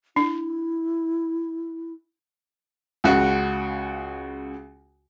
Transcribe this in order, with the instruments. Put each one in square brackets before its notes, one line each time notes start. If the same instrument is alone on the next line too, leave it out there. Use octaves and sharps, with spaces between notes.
[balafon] D4 [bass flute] E4
[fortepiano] C#2 C#3 F#4